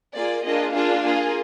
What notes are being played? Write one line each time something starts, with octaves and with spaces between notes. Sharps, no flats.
A#3 F4 G#4 D5
A#3 D4 F4 G#4 D#5
A#3 D4 F4 G#4 F5
A#3 F4 G#4